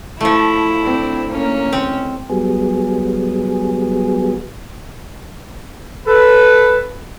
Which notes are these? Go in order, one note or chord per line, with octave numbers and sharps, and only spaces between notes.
F3 A3 E4
C4 D4
A#3 C#4
C#2 C4
F#3 G3 B3 G#4
A4 B4